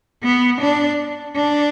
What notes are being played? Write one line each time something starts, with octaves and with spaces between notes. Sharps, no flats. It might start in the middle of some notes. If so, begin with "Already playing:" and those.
B3
D4
D4